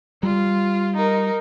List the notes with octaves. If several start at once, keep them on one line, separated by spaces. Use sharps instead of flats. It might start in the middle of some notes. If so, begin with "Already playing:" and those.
G3 F4
D#4 A#4